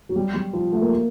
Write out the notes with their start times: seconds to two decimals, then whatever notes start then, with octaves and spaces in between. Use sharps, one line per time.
0.09 F#3
0.16 G3
0.34 G3
0.53 F3
0.72 A3
0.81 A#3